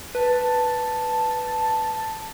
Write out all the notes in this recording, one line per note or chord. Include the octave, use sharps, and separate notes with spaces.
B4 A5